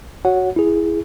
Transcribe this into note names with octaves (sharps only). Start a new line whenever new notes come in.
F#4 C#5 F#5
E4 G#4